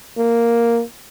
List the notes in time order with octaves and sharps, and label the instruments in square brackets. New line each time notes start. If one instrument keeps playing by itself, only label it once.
[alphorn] A#3